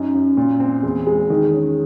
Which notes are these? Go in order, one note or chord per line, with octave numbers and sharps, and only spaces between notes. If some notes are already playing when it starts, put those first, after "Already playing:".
Already playing: F#2 D#4
F#2
A#2
C4
E2
G#3
D#3
C#4